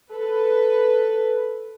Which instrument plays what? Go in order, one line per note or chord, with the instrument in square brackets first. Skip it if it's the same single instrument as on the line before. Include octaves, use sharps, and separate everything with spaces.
[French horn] A4 [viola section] B4